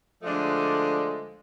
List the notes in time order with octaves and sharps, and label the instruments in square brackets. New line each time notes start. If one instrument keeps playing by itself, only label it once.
[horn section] D3 F3 G#3 A3 D5